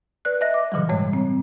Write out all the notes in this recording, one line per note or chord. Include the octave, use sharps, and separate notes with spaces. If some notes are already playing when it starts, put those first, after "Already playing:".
B4 D5 F#6
D#5 E5 F#6 A#6
D6
A#2 C#3 E3 F#3 G3
G#2 G3 G#3 C#5
C4